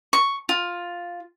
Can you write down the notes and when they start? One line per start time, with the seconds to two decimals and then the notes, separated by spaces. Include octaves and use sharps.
0.13 C#6
0.49 F4